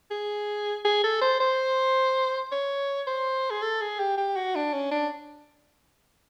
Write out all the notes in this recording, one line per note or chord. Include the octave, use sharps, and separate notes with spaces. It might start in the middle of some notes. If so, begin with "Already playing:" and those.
G#4
G#4
A4
C5
C5
C#5
C5
G#4
A4
G#4
G4
G4
F#4
D4
C#4
D4